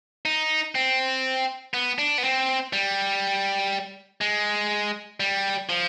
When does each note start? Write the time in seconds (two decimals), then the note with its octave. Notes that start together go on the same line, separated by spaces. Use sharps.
0.25 D#4
0.75 C4
1.74 B3
1.98 D4
2.18 B3
2.23 C4
2.73 G3
4.21 G#3
5.20 G3
5.69 F3